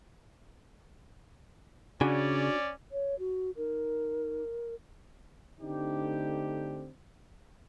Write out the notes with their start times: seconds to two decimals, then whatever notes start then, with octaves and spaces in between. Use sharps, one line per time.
2.01 C#3 C#4 D4 F#4 D5 G#5
2.91 C#5
3.19 F#4
3.57 D#4 A#4
5.61 D3 A3 C4 D4 D#4 G4